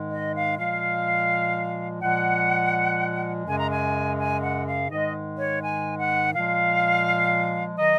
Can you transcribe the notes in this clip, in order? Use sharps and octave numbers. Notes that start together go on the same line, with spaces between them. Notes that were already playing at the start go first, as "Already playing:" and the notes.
Already playing: G#2 D#3 G#3
D#5
F5
A#2 F3 G#3 F5
A#2 F3 G#3 F#5
F#2 C#3 G#3 G#5
A#5
G#5
G#5
F#5
F5
G#2 D#3 G#3 D#5
C#5
G#5
F#5
A#2 F3 G#3 F5
D#3 F#3 D#5